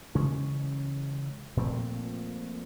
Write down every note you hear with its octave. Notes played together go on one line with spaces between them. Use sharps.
C#3 E3 G#3 C#4
A#2 F3 A3 C4